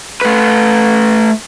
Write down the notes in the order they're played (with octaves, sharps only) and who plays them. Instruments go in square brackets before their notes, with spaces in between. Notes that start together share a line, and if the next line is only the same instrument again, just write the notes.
[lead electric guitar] A3 B4